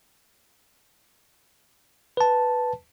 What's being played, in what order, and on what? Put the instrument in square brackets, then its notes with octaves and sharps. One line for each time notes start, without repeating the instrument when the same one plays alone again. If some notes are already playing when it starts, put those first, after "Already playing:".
[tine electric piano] B4 A5